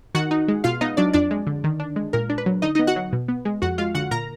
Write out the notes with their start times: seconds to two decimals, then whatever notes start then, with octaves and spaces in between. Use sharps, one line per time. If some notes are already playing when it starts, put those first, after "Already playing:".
0.15 D#3 F#4 F#5
0.31 D#4
0.48 G#3
0.64 B2 F4 F5
0.81 B3 D#4 D#5
0.97 F#3 D4 D5
1.13 F2 D4 D5
1.31 G#3
1.47 D3
1.64 D#3
1.80 D4
1.96 G#3
2.13 A#2 A#4
2.30 D4
2.38 B4
2.46 F#3
2.62 D3 D#4 D#5
2.75 B3 D#4 D#5
2.87 F#4 F#5
2.96 F#3
3.13 B2
3.28 B3
3.45 G#3
3.62 F2 F#4 F#5
3.78 G#3 F4 F5
3.95 D3 F#4 F#5
4.11 A#2 A#4 A#5